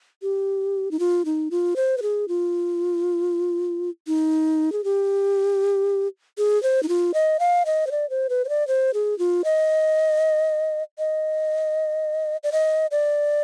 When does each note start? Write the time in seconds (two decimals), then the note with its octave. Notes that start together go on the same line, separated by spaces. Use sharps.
0.22 G4
0.91 D#4
0.99 F4
1.25 D#4
1.51 F4
1.76 C5
1.98 B4
2.02 G#4
2.28 F4
4.07 D#4
4.72 G#4
4.84 G4
6.38 G#4
6.63 C5
6.83 D#4
6.89 F4
7.14 D#5
7.40 F5
7.66 D#5
7.87 C5
7.91 D5
8.10 C5
8.30 B4
8.45 C5
8.49 D5
8.68 C5
8.94 G#4
9.19 F4
9.45 D#5
10.99 D#5
12.44 D5
12.52 D#5
12.91 D5